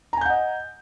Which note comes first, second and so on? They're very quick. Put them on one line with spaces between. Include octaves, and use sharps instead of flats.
A#5 G#5 G6 F#5 D#5